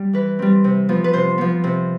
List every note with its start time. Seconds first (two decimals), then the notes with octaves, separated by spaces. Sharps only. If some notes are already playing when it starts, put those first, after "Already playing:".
Already playing: G3
0.13 E3 B4
0.39 G3 C4
0.64 C3
0.89 F3 B3
1.04 B4
1.13 C3 C5
1.38 F3 B3
1.64 C3